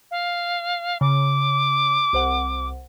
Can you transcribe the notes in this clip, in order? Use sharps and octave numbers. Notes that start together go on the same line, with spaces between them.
F5
C#3 D6
C2 C5 F#5